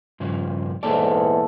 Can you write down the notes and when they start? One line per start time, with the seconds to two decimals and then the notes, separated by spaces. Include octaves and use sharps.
0.20 G2 C#3 F3
0.83 E2 G#2 A#3 A4 C#5 D5